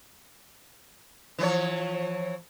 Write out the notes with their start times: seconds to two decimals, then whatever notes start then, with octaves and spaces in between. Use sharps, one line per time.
1.39 E3 F3 C#5